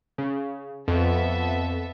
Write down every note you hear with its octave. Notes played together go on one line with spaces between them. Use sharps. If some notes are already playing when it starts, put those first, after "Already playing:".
C#3
F2 B3 A4 E5